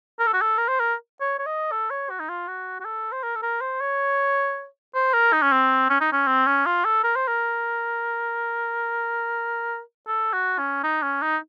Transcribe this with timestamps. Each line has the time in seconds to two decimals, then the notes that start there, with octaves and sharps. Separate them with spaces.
0.19 A#4
0.27 A4
0.34 F#4
0.42 A4
0.58 A#4
0.69 C5
0.80 A#4
1.21 C#5
1.39 C#5
1.46 D#5
1.72 A4
1.90 C#5
2.10 F#4
2.20 D#4
2.29 F4
2.48 F#4
2.80 F#4
2.85 A4
3.12 C5
3.23 A#4
3.35 A4
3.42 A#4
3.61 C5
3.81 C#5
4.95 C5
5.14 A#4
5.33 D#4
5.42 C#4
5.52 C4
5.90 C#4
6.01 D#4
6.12 C#4
6.27 C4
6.47 C#4
6.66 F4
6.85 A4
7.04 A#4
7.16 C5
7.28 A#4
10.08 A4
10.33 F#4
10.59 C#4
10.84 D#4
11.02 C#4
11.22 D#4